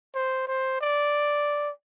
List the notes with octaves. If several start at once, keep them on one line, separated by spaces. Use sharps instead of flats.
C5
C5
D5